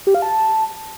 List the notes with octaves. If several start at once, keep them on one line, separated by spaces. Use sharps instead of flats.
G4
F5
A5